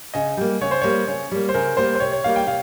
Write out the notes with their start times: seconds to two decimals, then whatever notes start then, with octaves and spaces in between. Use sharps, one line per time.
0.14 C#3 D#5
0.37 G3 A#3
0.61 C#3 C#5
0.71 C5
0.82 G3 A#3 C#5
1.07 C#3 C#5
1.31 G3 A#3
1.49 C5
1.54 C#3 A#4
1.77 G3 A#3 C5
1.95 C5
2.00 C3 C#5
2.12 C#5
2.24 G3 A#3 D#4 F5
2.36 G5
2.47 C3 F5